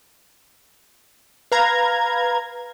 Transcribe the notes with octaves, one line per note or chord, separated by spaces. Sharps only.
B4 F5 A#5 G#6